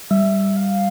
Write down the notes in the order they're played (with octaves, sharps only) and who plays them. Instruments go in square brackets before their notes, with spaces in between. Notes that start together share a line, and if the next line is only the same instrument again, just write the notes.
[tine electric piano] G3 [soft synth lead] E5
[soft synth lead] F5